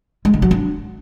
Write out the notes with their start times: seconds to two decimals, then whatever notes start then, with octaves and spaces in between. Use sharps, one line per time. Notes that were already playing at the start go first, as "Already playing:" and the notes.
0.25 G#3
0.34 D3
0.42 F#3
0.51 D4